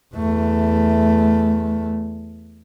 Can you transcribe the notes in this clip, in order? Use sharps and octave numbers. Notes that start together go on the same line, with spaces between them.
E2 A3